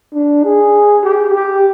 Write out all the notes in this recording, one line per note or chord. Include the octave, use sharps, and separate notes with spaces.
D4
G#4
G4
G4